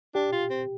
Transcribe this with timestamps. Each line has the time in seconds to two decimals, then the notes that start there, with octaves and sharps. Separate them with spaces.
0.15 D4 G4
0.32 F4
0.50 C4